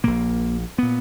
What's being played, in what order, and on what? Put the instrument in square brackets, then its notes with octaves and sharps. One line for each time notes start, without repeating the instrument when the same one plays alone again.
[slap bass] A#1 A#2 A#3
A#2 B3